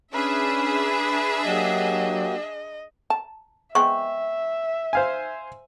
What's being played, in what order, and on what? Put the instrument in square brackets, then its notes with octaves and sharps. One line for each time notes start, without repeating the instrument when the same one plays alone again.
[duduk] C#4 [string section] D4 G#4 E5 [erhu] B4
[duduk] F#3 [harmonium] A#3 F#4 G4 [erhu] D#5
[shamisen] A5
[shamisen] G#3 B3 C4 [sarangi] E5 [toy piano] C#6
[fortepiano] C5 F5 G#5